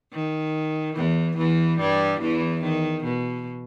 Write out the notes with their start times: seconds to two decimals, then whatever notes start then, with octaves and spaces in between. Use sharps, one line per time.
0.13 D#3
0.96 E2 E3
1.38 E2 E3
1.80 G2 G3
2.21 E2 E3
2.62 D#3
3.04 B2